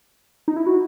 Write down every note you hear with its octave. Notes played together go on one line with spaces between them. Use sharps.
D#4
E4
F#4